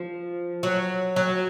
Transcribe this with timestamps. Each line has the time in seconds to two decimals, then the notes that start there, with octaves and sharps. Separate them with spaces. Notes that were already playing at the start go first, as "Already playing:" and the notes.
Already playing: F3
0.63 F#3
1.16 F#3